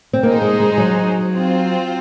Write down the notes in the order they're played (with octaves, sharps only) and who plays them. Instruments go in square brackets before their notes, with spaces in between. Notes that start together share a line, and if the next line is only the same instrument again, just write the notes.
[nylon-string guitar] C4
[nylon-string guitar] A#3 [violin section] D#4 G#4 C5
[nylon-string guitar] G#3
G#3
G#3
F#3
[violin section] C4 F4 C5